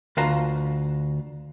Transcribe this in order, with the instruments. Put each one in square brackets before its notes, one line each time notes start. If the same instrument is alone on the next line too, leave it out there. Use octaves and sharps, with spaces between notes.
[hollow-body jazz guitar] D2 F4 B4 F5 A5 A#5